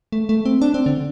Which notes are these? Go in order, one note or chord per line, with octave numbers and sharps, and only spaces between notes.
A3
A3
C4
D4
C4
D3